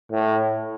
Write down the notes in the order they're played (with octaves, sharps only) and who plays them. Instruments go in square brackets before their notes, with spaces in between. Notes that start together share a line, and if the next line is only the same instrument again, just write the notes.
[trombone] A2